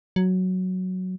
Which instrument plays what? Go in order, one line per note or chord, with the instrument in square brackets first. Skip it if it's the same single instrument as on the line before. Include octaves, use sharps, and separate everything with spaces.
[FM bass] F#3